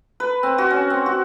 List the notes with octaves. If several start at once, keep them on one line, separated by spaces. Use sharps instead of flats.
B4
C4
F#4
C#4
C4
F#4